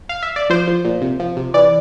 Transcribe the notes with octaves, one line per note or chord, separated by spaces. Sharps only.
F5
E5
D5
F3 C5
F3
A#2
C3
F3
C3
E3 D5